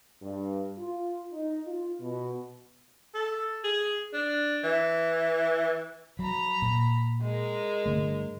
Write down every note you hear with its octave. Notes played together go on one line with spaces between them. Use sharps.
G2
F4
D#4
F4
B2
A4
G#4
D4
E3
F#3 A#5 B5
A#2
G#3 A#4
G2 D3 A3